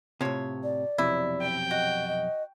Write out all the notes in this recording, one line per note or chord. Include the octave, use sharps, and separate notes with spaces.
A2 C3 F3 C#5
D5
B1 F2 C3 E4
G5
F#4 D#5
D#5